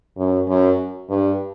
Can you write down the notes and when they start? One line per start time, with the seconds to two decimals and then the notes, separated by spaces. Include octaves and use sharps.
0.18 F#2
0.48 F#2
1.09 G2